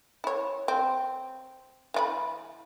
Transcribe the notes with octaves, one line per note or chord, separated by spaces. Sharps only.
E4 C#5
C4
E3 F4 B5